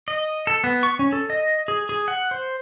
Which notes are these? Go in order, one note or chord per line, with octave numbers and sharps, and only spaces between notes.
D#5
A4
B3
C#6
C#4
A4
D#5
G#4
G#4
F#5
C5